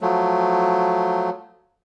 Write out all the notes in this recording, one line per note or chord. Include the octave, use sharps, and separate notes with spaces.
F3 F#3 A3